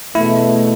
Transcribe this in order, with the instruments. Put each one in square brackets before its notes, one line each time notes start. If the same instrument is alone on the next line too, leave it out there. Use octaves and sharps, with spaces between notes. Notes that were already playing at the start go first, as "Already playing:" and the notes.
[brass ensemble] E2 B2 A3 [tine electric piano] E4